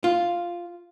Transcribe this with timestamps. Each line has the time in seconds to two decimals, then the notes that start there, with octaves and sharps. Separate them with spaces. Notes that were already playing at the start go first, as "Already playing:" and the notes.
0.04 F4